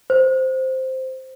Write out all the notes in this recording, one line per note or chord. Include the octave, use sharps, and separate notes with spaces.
C5